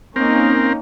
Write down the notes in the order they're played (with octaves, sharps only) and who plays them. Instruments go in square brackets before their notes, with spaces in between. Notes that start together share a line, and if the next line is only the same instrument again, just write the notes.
[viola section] A#3 C#4 D#4 [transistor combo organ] C4 A#4